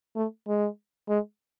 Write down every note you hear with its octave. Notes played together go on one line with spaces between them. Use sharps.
A3
G#3
G#3